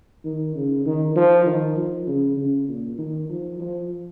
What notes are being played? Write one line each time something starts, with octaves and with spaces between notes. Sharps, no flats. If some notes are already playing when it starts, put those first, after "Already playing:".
D#3
C#3
D#3
F3
D#3
F3
C#3
C#3
A#2
D#3
F3
F3